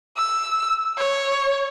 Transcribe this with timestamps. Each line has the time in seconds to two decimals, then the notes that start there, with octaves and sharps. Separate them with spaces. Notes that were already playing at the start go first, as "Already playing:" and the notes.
0.17 E6
0.98 C#5